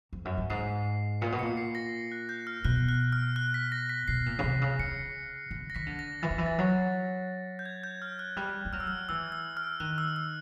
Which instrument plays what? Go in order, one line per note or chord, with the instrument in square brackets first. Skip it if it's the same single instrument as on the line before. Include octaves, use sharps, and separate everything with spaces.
[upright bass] F2
F#2
G2
[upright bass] G#2 [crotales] C7
[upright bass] A#2 [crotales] C#7
[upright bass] B2
[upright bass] A#2 [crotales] C#7
[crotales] C7
A#6
F#6
G6
F6
[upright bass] B2 [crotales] F#6
[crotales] F#6
F6
F#6
B6
A#6
B6
[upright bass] B2 [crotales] C7
[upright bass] A#2
C#3
C3
C#3
[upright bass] C#3 [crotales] C#7
[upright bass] D3
[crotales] A#6
[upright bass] D#3 [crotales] B6
[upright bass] D3
[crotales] A#6
[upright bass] E3 [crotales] A6
[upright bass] D#3
E3
[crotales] A6
[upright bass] F#3
[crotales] A#6
G6
G#6
G6
F6
F#6
[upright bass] G3 [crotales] F#6
[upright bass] G3
[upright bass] F#3 [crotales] F6
[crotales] E6
F6
[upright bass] E3 [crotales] E6
[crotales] E6
F6
[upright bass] D#3 [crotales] F#6
[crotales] E6
E6